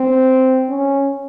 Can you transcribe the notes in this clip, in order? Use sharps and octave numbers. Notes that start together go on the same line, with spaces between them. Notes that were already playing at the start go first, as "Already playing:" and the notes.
Already playing: C4
C#4